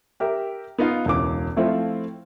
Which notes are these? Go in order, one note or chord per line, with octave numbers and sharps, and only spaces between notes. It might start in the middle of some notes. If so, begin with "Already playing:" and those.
G4 A#4 E5
B3 D#4 F4 F5
E1 C#2 E3 D6
F3 A3 C4 E4 F4